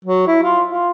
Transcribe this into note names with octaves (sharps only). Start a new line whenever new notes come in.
F#3
E4
F4
F4